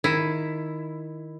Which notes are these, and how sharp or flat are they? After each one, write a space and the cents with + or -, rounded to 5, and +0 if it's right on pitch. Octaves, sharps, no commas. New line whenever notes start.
D#3 +0 E4 +5